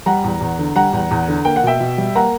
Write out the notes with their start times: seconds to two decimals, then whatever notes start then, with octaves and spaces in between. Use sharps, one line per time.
0.06 G3 F#5 A#5
0.24 E2
0.41 E2
0.59 D3
0.76 G3 F#5 A#5
0.93 E2
1.11 E2
1.28 D3
1.45 A#3 G5
1.56 F#5
1.63 B2 E5 G5
1.80 B2
1.98 G3
2.15 A#3 F#5 A#5